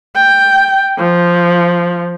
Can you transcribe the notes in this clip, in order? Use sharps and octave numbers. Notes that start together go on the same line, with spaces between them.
G5
F3